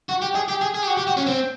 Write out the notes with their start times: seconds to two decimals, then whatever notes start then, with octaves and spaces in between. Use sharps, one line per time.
0.09 F#4
0.22 G4
0.35 G#4
0.48 G4
0.61 G#4
0.75 G#4
0.83 G4
0.88 F#4
0.97 G4
1.07 F#4
1.17 C#4
1.27 C4